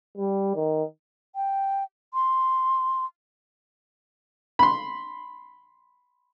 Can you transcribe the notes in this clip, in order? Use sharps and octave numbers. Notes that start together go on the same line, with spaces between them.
G3
D#3
G5
C6
B5 C6